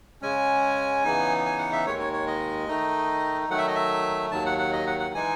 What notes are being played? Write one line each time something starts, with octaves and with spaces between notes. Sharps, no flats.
C#3 G#3 C#4 G#5
C#3 E3 B3 D#4
G#5
F#5
E5
D#2 D#3 G#3 C#5
C#5
C#5
D#5
D#3 A3 D#4
D#3 F#3 A3 F#5
E5
D#5
E5
D#2 D#3 F#3 A5
F#5
F#5
D#5
F#5
F#5
E3 G#3 D#4 G#5